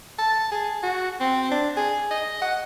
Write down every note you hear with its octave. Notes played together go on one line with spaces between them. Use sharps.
A5
G#4
F#4
C4
D4
G#4
D#5
F#5